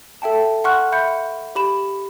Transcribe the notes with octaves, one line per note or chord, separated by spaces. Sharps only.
A4 E5 G5 A5
F#5 C6 C#6 F6 F#6
E5 B5 G6 C#7
G4 B5 E7